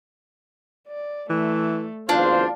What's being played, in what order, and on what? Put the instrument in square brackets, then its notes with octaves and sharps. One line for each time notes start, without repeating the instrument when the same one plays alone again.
[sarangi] D5
[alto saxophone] E3 [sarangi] A3
[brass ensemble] F#1 E2 C5 [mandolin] D4 [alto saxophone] F4 [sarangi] F5